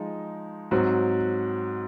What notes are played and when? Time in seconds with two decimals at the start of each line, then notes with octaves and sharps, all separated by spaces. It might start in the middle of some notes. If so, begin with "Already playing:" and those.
Already playing: F3 G#3 D#4
0.71 G#2 F#3 C4 F#4